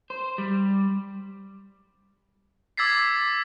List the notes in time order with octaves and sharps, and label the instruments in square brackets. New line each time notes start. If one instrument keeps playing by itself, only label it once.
[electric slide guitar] C5
G3
[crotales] D6 E6 G#6 A6 B6 C7